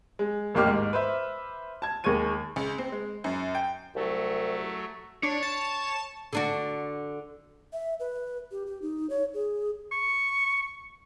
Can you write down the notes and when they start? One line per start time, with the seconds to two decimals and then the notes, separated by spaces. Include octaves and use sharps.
0.19 G#3
0.55 A1 D#2 A#3 G4 D6 F6
0.67 G#2
0.93 B4 C5 E5
1.82 A5 G#6
2.04 D#2 G#3 C#6 G#6 D#7
2.56 C#2
2.78 C4
2.92 G#3
3.24 F#2
3.55 G5
3.95 C2 F#3 A3
5.23 D4 C#5
5.43 A5
6.33 D3 D4 F#4
7.73 E5
8.00 B4
8.52 G4
8.67 G4
8.82 D#4
9.10 C#5
9.34 G#4
9.92 C#6